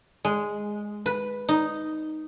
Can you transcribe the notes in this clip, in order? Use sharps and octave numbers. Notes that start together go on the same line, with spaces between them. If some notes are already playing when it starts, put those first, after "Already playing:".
G#3
B4
D#4